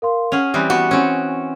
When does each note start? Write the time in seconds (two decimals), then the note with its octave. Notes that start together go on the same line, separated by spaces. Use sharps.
0.02 A#4 F5 C6
0.32 C#4 G#4 F#5 F6 F7
0.54 E3 G3 C4 D#6 F#6
0.70 B3 F#4
0.91 C4 C#4